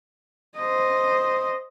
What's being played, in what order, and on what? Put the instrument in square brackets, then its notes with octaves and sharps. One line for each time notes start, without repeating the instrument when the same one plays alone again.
[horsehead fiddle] C5 D#5